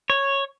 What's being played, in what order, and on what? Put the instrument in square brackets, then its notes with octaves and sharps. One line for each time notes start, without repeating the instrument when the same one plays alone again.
[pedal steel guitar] C#5